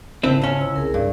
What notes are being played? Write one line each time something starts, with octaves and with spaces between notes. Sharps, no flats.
G#1 C#3 C4 E4 B4 C5 A5
C#2 C#4
E4 E6
C2 G#4 A#4
G2 D5